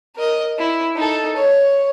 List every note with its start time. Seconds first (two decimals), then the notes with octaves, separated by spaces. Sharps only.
0.15 A#4 D#5
0.58 E4
0.95 D#4 A4
1.36 C#5